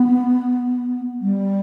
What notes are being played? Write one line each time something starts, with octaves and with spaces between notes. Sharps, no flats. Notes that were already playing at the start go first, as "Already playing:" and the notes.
Already playing: B3
G3